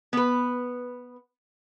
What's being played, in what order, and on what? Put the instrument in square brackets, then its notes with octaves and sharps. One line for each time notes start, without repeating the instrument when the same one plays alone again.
[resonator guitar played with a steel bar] B3 B4